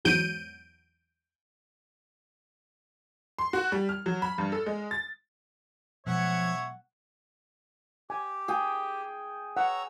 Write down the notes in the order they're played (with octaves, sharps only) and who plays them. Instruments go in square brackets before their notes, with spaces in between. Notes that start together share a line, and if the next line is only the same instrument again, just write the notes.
[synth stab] E2 G#2 F#3 G6 D7 D#7
[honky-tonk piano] C6
F#4
G3
F6
F#3
B5
G2
A4
G#3
A6
[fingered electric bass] B2 F#3 G#3 [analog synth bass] F3 [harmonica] C#5 E5 [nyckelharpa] F#5
[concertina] G4 [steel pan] G#5
[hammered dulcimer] G#4 G5
[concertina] C#5 A#5 E6 [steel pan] F#5